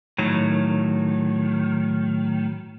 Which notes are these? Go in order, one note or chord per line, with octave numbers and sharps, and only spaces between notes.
A2 D#3 F#3